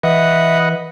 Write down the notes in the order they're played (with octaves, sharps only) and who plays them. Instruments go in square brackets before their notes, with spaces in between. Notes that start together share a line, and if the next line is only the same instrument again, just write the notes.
[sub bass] E3 [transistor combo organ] B4 D#5 F#5 [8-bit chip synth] E5 D#6